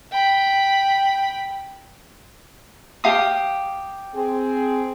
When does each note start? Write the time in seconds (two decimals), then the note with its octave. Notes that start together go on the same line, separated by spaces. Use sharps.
0.12 G5 B5
3.04 G4 F5 D#6
4.14 C4 G#4